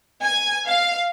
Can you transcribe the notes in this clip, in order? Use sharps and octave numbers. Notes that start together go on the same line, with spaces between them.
G#5
F5